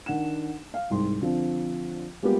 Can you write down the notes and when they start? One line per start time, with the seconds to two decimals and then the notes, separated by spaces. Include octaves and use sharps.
0.06 D#3 D4 F#5 E7
0.74 F5
0.90 C2 G#2 C6
1.21 D3 F3 C4
2.23 G3 G#3 A#3 B3 F4 G4